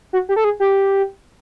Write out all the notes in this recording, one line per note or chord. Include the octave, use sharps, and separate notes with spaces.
F#4
G4
A4
G#4
G4